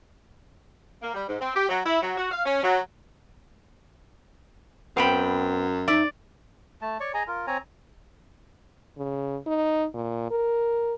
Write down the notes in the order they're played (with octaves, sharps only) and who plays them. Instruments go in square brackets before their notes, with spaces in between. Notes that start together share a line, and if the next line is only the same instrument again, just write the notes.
[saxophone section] A#3
G3
G#2
C4
G4
F#3
E4
F#3
F#4
F5
C#4
F#3
[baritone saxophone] F#2 [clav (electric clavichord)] B3 C4 [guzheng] F5 G5 B5
[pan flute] D#4 [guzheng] D5 [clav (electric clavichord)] E5
[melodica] A3 A5
C#5 D5 C#6
G#4 D#5 G#5 A#5
F4 A#4
C4 C#5 G#5 A#5
[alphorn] C#3
D#4
A#2
A#4